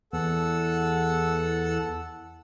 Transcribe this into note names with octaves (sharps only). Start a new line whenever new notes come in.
E2 A4 F#5 E6